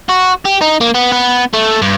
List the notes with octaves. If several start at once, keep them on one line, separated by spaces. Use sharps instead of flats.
F#4
G4
D#4
A#3
B3
B3
A3
G2